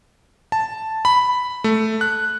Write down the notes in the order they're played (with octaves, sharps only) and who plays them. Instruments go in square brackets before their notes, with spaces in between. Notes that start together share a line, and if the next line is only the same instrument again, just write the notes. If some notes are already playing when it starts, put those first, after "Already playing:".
[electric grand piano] A5
B5
A3
F#6